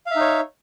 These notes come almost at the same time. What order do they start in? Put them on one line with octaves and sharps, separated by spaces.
F5 E5 D#4 C#5